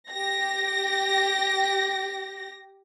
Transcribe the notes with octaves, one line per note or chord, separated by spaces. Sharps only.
G4 A#6